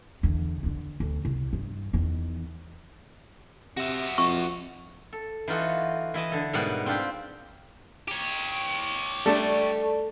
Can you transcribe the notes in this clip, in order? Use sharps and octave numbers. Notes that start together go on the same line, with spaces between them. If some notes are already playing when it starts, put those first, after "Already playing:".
E2 D3
D3 D#3
D2
C2
G2
E2 D#3
C3 F#4 E5
F2 C#6
A4
E3 D#4 F4 F#4 A4
E3 E4 D#5 A5
D3 A4
G#2 B2 G3 A#4 D5 F#5
C4 D4 F4 G4
G4 C#5
G3 A3 D4 A4 D5